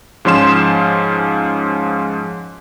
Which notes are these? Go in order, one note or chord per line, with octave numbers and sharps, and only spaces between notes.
G#2 F3 C#4 C6 E7